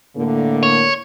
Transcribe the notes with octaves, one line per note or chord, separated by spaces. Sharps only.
A2 D3 A#3
C#5